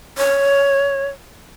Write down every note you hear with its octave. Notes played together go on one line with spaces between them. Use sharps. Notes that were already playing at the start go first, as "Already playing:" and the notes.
C#5